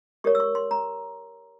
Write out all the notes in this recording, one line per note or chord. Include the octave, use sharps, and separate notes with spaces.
G4 A#4 C#5 C#6
E6
C#6
C6
A#5